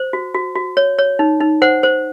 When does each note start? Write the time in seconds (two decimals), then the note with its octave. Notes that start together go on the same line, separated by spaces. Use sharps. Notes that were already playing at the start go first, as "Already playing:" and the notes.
Already playing: C5
0.13 F#4
0.34 F#4
0.56 F#4
0.77 C#5
0.98 C#5
1.19 D#4
1.41 D#4
1.62 C5 F#5
1.83 C5